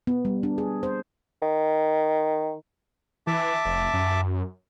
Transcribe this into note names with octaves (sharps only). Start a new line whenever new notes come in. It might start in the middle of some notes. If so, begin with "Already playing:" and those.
B3
G3
D4
G#4
C5
D#3
E3 E5 A5 D6
F1
F#2